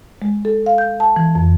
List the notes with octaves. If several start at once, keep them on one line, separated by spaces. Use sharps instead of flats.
G#3
A4
F5
G6
A5
E3
F2